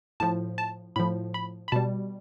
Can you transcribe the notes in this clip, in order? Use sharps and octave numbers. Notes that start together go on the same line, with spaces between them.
A2 F3 A5
A5
A2 F3 B5
B5
B5
B2 G3 A5